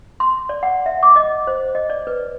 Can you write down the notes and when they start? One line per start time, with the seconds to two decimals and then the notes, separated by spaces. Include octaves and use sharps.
0.20 C6
0.49 D5
0.63 F#5
0.86 E5
1.03 D6
1.16 D#5
1.47 C5
1.75 D#5
1.90 D5
2.07 B4